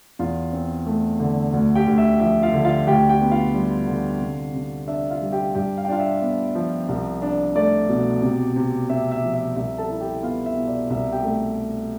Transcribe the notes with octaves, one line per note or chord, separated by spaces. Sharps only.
E2 F4 F5
C4
A3
D3
D2
G4 G5
D2
E5
F3 E5
F4 F5
D3
F4 F5
D2 G4 G5
G4 G5
B3
F4 F5
G3
D3
C3
C3
D4 E5
F4 F5
G3
G4 G5
G2 G4 G5
F5
G5
D4 F4 F5
E5
B3
F3
C2
D4
A3 D5
B2
C3
C3
C4 E5
E5
F3
E5
C2 E5
A4 A5
E4
G4 G5
B3 F4 F5
E5
B2
D5
C2 E5
G4 G5
A3